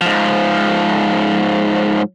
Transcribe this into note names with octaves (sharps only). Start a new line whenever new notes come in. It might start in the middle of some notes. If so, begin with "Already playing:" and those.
G#2 F3